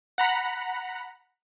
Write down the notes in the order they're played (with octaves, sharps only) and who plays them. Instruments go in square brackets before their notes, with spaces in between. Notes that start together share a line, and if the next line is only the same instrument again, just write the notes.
[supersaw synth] F#5 A#5 B5